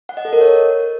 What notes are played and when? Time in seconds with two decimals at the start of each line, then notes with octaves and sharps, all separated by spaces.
0.09 F#5
0.17 D#5
0.25 A4
0.33 A#4
0.41 C#5